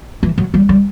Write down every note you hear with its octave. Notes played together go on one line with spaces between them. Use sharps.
E3
F#3
G3
G3